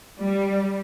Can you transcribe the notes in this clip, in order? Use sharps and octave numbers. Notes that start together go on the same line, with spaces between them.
G3